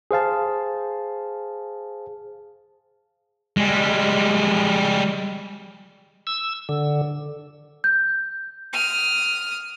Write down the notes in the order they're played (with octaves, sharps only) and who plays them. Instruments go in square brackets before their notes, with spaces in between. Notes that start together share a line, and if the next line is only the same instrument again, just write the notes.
[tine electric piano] G#4 C5 F5 A5
[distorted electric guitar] G3 G#3
[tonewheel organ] E6
D3
[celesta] G6
[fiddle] D#6 F6